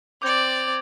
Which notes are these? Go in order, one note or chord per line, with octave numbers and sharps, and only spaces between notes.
C4 D5 D6 G6 G#6